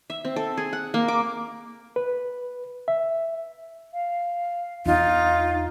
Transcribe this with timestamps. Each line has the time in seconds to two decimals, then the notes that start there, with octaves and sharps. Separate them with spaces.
0.10 E5
0.25 C4
0.36 A4
0.57 G#4
0.73 F#5
0.94 A#3
1.08 D6
1.96 B4
2.88 E5
3.93 F5
4.86 E2 D4 D#4 F4